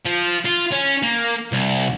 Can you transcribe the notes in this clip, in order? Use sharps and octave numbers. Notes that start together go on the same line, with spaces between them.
F3
F4
C#4
A#3
C2